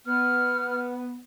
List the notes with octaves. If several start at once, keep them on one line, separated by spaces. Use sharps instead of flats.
B3 F6